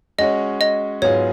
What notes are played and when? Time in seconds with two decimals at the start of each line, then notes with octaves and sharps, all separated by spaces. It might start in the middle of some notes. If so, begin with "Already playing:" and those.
0.18 G#3 C#4 F#4 C#5 D#5
0.61 D#5
1.02 G#2 F#3 B3 F4 G#4 C#5